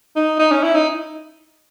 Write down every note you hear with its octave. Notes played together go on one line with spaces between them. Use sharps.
D#4
D#4
C#4
E4
D#4